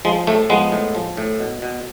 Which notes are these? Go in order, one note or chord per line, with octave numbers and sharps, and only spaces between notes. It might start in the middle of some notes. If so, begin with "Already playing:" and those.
F3 G#3
A2 A3
F3 G#3 B3
A2
F3
A2
B2
B2